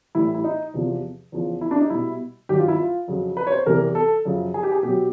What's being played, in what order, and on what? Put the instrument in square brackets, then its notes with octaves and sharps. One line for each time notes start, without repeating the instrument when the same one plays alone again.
[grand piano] A2 E3 G3 E4
E4
D#4
E2 C3 F3
E2 C#3 F3
E4
D4
D#4
B2 G3 E4
G2 D#3 F#3 G4
F4
E4
F4
F2 C#3 F#3
B4
C#5
C5
E2 C3 E3 G3 A#4
A4
F#2 C#3 F3
G#4
G4
G#4
B2 F#3 G4